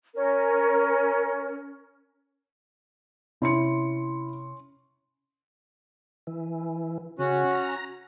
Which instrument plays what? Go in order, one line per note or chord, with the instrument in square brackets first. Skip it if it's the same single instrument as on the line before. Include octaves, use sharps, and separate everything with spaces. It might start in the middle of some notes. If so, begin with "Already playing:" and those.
[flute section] C#4 A#4
[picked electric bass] C3 [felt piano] C#4 C6 C#7 [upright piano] E4
[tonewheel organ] E3
[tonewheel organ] C#3 [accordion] C#4 F#4
[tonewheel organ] A#5